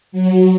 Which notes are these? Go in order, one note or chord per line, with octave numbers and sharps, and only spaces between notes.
F#3